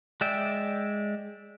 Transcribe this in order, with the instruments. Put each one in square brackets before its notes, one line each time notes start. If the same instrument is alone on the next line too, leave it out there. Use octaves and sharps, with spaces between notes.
[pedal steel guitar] G#3 D5 E5 G5